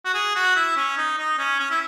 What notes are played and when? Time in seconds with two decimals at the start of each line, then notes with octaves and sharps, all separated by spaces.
0.05 F#4
0.14 G#4
0.35 F#4
0.56 E4
0.77 C#4
0.97 D#4
1.18 D#4
1.38 C#4
1.60 C#4
1.70 E4